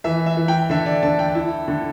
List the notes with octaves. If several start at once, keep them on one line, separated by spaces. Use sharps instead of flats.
E3 E5
E5
E3
G5
D3 E5
D5
D3 A5
G5
E4
D3